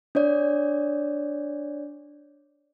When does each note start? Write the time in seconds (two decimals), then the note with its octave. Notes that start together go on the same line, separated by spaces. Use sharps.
0.15 D4 C#5 D5